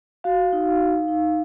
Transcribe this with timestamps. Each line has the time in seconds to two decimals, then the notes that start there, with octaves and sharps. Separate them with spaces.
0.24 F#4 F5
0.53 D#4
0.81 D#4
1.08 D#4